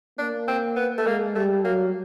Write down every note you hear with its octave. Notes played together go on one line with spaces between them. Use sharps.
A#3 D4
C4
B3
A3
G#3 A#3
G3 A3
F#3 A#3